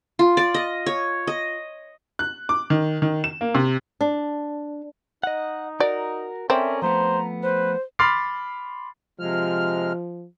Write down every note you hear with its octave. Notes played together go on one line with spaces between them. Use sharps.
F4
D5
D#5
C#5
D#5
F#6
D6
D#3
D#3
E7
A#3
C3
D4
D#4 D#5 F#5
F#4 A#4 D5
C4 C#4 A4 A#4 D5 E5
F3 A3 B3 C5 A#5
B4 C5
B5 C6 D6 F6 A6 C7
C3 F3 G#3 F6